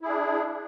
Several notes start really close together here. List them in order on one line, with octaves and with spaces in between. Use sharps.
E4 G#4 D4